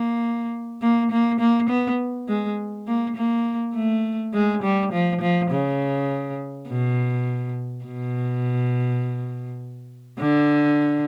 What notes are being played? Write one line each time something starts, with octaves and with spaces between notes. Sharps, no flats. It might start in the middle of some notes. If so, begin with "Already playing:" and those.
Already playing: A#3
A#3
A#3
A#3
B3
G#3
A#3
A#3
A3
G#3
G3
F3
F3
C#3
B2
B2
D3